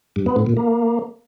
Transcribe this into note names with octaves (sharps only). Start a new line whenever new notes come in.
G2
B3
A2
A#2
A#3